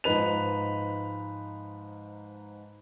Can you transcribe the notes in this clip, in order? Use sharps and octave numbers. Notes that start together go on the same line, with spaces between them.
G#2 F3 D#4 B4 F7